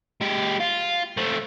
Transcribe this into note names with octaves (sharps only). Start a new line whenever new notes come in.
G#3 G4
F4
A3 C4